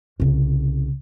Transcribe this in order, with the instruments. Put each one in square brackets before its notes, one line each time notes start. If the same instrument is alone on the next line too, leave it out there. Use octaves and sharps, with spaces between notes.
[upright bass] C2 C#3